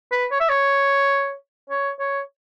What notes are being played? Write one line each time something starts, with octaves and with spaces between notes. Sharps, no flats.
B4
C#5
E5
C#5
C#5
C#5